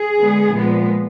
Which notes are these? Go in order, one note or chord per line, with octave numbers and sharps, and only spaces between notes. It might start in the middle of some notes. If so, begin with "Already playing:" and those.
Already playing: G#4
D3 G#3 B3
A#2 F3 G#3 B3